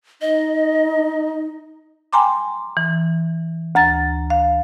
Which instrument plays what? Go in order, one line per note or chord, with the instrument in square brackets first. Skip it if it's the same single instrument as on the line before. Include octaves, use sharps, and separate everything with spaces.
[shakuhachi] D#4 [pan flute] D#5
[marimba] G5 G#5 A#5 C6 D6
E3
D2 A#5 A6
F5